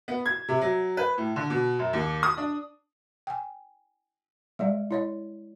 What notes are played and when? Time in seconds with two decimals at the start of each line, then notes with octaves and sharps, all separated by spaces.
0.08 B3
0.26 G#6
0.48 C3
0.61 F#3
0.97 B4
1.18 A2
1.36 D3
1.50 B2
1.79 F#2
1.93 D#2
2.23 D#6
2.37 D4
3.27 G5 G#5
4.59 G3 G#3 D5
4.91 E4 C#5 D#5